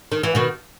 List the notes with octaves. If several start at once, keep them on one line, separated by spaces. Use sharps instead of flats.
D#3
E3
B2 D#3